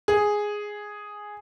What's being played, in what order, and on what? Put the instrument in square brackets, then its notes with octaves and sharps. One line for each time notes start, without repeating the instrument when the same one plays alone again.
[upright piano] G#4